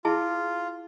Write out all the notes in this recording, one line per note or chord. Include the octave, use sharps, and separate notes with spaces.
E4 F4 G#4 A5